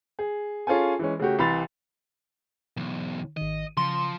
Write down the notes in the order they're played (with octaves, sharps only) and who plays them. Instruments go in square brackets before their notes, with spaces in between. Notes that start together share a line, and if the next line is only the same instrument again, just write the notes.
[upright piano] G#4
C#4 F4 G#4 A4 G#5
E3 G#3 C#4
C#3 A3 F#4 G4
C2 E3 B5 C6 A6 F7
[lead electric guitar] B1 E2
[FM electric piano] G#1 D#3 [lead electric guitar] D#5
[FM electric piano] C#3 A#6 C#7 [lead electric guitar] F3 [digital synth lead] C6